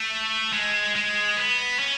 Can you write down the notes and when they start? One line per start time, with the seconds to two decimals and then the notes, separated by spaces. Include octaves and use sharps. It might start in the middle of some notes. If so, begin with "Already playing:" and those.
Already playing: A3
0.53 G#3
0.95 G#3
1.37 B3
1.79 C#4